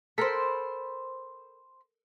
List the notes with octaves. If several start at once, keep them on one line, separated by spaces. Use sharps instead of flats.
A4 A#4 C5 G5 B5